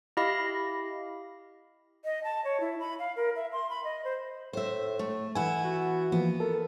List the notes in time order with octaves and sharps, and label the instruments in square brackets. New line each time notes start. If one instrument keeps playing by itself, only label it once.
[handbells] E4 G4 D#5 F5 B5 A#6
[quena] D#5
A5
C#5
E4
B5
F5
A#4
E5
C6
B5
D#5
C5
[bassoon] A2 [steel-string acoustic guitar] C5 E5
[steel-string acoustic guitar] A3
[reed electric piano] E3 F#5 G#5 [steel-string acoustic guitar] B3 E4
[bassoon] F#4
[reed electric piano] E3 F3 A#3 [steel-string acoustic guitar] B3
[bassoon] A4 [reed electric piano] A#4